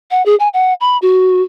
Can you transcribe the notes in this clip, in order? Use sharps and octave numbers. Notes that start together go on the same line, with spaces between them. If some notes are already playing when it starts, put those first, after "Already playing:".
F#5
G#4
G#5
F#5
B5
F#4